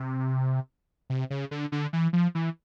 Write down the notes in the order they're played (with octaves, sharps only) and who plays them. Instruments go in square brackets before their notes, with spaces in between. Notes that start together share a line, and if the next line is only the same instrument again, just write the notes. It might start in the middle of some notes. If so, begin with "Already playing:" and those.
Already playing: [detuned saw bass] C3
C3
C#3
D3
D3
E3
F3
E3